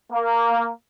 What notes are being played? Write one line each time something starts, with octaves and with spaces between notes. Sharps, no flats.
A#3